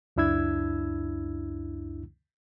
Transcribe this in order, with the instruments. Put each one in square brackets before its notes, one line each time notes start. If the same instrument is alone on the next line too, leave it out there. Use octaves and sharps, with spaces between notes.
[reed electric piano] C#2 F#2 D4 E4 E6 G#6